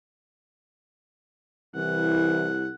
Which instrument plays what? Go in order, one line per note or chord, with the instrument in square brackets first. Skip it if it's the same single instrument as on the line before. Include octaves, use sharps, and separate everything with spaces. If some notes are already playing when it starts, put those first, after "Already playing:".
[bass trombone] C2 [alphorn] E3 [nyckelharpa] F#5